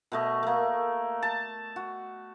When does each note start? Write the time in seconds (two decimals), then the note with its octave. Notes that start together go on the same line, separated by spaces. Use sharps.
0.12 B2 A3 D#5
0.43 A3 A#3
1.22 A5
1.76 F#4